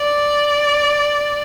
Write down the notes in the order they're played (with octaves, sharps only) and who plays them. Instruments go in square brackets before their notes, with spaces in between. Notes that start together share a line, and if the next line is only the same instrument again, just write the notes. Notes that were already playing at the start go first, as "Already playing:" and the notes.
Already playing: [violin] D5